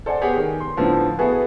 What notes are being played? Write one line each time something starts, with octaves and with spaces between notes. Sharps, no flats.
A4 C5 D5 F#5 G#5
B3 G4 G#4 C5 C#5 F#5
D#3
C6
A2 D3 F3 B3
B3 E4 F#4 G#4 A4 B4